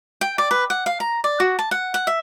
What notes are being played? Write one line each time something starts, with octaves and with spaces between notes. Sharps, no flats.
G5
D5
B4
F#5
F5
A#5
D5
F#4
A5
F#5
F#5
E5